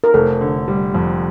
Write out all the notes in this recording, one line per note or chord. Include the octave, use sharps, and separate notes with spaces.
A#4
F1 A4
D3
G3
F2